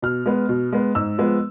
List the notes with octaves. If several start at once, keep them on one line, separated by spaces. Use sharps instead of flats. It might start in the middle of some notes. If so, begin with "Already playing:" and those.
B2 F6
G#3 B3
B2
G#3 B3
G#2 E6
F3 G#3 B3